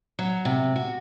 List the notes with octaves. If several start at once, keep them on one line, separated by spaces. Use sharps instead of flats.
F#3
C3
F#4